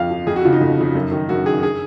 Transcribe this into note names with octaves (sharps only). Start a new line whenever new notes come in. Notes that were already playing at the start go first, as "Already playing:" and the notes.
Already playing: F2 F3 F5
F3
F2 G#4
F#4
C#3 F3 F4
D#4
F2
C#3 F3
F#2
D#3
F#2 F#4
D#3 G#4
G#4